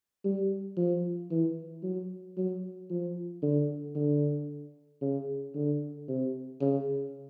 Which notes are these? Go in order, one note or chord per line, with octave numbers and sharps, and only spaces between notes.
G3
F3
E3
F#3
F#3
F3
D3
D3
C#3
D3
C3
C#3